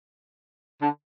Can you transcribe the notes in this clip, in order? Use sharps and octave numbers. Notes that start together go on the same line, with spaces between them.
D3